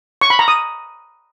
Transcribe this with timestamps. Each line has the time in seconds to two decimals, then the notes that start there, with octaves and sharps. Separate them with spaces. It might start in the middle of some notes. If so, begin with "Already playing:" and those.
0.21 C#6
0.30 B5
0.39 A#5
0.48 D#6